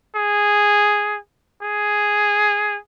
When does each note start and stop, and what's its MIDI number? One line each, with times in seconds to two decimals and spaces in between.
0.16 1.19 68
1.63 2.78 68